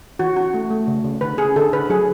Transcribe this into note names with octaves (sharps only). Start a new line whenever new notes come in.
E3 F#4
C#4 F#4
A3
A3
C#3
C#3
D3 B4
C#4 G#4
D3 A4
D3 B4
F#3 G#4